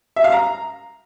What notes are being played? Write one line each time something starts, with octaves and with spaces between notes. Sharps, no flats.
E5
F5
A#5